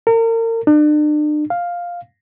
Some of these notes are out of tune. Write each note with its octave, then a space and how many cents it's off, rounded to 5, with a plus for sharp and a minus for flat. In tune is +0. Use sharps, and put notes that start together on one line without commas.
A#4 -35
D4 +40
F5 +5